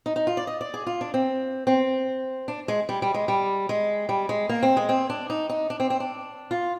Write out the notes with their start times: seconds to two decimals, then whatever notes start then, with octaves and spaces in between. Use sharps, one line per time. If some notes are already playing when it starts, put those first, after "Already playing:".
0.06 D#4
0.16 D#4
0.27 F4
0.37 D5
0.47 D#5
0.61 D5
0.74 G#4
0.86 F4
1.01 D4
1.14 C4
1.67 C4
2.48 D4
2.68 G#3
2.89 G3
3.02 G3
3.14 G#3
3.28 G3
3.69 G#3
4.09 G3
4.29 G#3
4.49 A#3
4.63 C4
4.77 G#3
4.89 C4
5.10 D4
5.30 D#4
5.50 D#4
5.70 D4
5.80 C4
5.90 C4
6.00 D4
6.51 F4